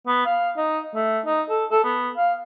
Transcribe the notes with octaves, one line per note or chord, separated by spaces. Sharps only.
B3
F5
D#4
A3
D#4
A4
A4
B3
F5